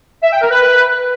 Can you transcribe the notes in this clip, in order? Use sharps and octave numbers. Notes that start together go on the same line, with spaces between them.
E5
G5
A#4
B4